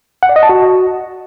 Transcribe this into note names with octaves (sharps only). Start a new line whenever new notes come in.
F#5
D5
D#5
A5
F#4